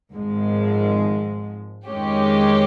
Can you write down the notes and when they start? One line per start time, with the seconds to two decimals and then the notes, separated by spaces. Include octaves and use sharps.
0.13 G#1 G#2 F3 G#3
1.86 F2 D#3 G#3 C#4 G4